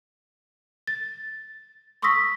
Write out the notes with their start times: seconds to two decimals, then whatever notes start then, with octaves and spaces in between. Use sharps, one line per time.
0.87 A6
2.02 C6 C#6 D#6 E6 A#6 B6